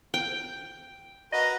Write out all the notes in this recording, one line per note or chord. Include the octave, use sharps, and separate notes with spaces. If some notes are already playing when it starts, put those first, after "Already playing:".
G5
F#4 A#4 B4 D#5